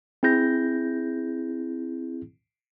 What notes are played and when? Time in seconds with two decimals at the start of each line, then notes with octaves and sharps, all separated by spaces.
0.23 C4 E4 G#4 G6 A#6